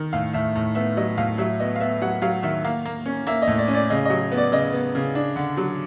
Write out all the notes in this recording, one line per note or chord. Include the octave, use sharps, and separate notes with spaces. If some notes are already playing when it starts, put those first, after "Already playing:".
Already playing: D#3
A2 F5
A2 E5
A2
B3 E5
F#3 D#5
A2 F5
F#3 E5
B3 D#5
F5
B3 E5
F#3 F#5
F#3 F5
D#3 E5
A#3 F5
A#3
C#4
A#3 E5
D#5
A2
D5
C#4
D5
C#3 D#5
F#3 D#5
B3
D5
C#3 D#5
B3
C#3
D4
D3
F#3